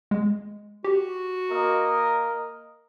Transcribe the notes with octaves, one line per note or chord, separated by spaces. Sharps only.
G#3
F#4 G4
A#3 A#4 D#5